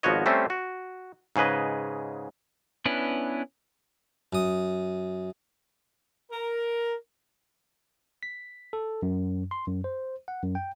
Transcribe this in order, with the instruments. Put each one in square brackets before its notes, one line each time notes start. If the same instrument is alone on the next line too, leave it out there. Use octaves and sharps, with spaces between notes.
[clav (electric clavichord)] G#1 F3 B3 F#4 C#5 D#5
G3 A3 C4 C#4 C5 E5
F#4
G#2 C#3 G#4 B4 D#5
[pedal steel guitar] B3 C#4 D4 E4 B4
[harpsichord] F#2 D#6
[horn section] A#4
[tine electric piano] B6
A4
F#2
C6
F#2
C5
F#5
F#2
G5